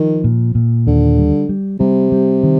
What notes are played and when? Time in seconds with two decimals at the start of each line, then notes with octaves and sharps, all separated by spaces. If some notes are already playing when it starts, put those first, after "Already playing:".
Already playing: D#3 F3
0.24 A#2
0.55 A#2
0.87 D#2 D3
1.18 G3
1.49 G3
1.80 C3 G3
2.12 G3
2.43 D#3